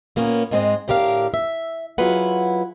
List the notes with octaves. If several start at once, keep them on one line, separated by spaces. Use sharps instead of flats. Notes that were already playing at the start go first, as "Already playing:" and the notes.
A#2 A#3 B3 C#4
G#2 G#3 C4 C5 D#5
A2 D3 G4 A#4 F5
E5
F#3 E4 F4 G#4 B4 F#5